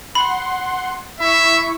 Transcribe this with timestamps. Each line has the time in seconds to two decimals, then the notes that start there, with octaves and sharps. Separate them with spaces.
0.15 F#5 B5 C6
1.20 E4 E5 C#6